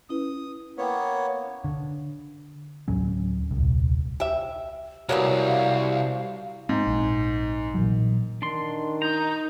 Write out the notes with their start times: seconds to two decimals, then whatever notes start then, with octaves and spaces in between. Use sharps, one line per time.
0.09 C#4 E4 B4 D#6
0.78 A#3 B3 B4 C#5 G5
1.64 D3
2.88 D2 A2 F#3 C#4
3.51 D#1 C2
4.20 G4 E5
5.09 C2 F#3 G3 A#3 B3 F5
6.69 G#2 C4
6.87 A#1
7.74 A#2 E3 F#3
8.42 D#3 D4 C6
9.02 D#4 A#5 G6